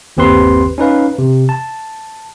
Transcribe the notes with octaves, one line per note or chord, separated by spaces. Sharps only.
G1 D#2 C4 G4 B4 C6
C#4 D#4 B4 F5
C3
A5